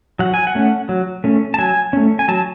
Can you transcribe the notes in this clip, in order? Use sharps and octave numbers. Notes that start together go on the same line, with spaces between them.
F#3 F#5
G#5
F#5
A3 C#4
F#3
A3 C#4
A5
F#3 G#5
A3 C#4
G#5
F#3 A5